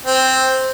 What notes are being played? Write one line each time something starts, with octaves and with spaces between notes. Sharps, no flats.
C4